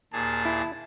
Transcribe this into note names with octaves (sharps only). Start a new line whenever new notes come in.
D#2 A#2 G#4 A5
E4